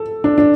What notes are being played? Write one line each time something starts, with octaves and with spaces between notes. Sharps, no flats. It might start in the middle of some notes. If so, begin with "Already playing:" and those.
Already playing: A4
D4
D4